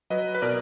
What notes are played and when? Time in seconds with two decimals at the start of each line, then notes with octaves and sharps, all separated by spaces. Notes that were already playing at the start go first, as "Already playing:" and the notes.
0.10 F#3 B4 D#5
0.35 B4
0.42 B2 A#4 D5